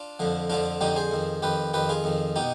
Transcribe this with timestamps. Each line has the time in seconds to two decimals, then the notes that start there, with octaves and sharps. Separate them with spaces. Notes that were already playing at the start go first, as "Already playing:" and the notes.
Already playing: D4 F4
0.20 F2 D3 F3
0.49 F2 D3 F3 D4 F4
0.81 F2 D3 F3 D#4 G4
0.96 G#4 C5
1.11 F2 D#3
1.42 F2 D#3 G4 B4
1.74 F2 D#3 G4 B4
1.89 F4 G#4
2.04 F2 D#3
2.36 B2 D#4 G4